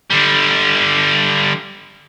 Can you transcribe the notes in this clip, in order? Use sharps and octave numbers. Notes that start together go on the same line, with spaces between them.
D3 G3